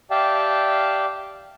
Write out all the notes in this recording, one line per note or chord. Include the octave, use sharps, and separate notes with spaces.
G4 D5 E5 F5 G5 A5